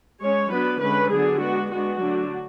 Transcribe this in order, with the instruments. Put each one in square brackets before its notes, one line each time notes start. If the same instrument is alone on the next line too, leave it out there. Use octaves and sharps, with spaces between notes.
[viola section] G#3 C#4 C#5
F#3 B3 D4 B4
D3 G#3 C#4 B4
D3 F#3 B3 D4 G#4
G#3 B3 D4 F#4
G#3 B3 D4 F#4
D3 F#3 A3 D4